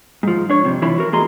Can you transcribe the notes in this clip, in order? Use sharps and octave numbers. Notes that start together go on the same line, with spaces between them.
G#2 F3
D4 C#5
F2 C3
E3 F3 E4 F4 C#5 B5
F#4 A#4
E2 A3 G#4 D#5 A#5 C6